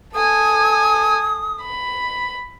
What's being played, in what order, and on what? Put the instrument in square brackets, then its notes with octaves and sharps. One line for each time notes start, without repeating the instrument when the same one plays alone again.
[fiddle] A4 G#5 [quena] D#6
[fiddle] B5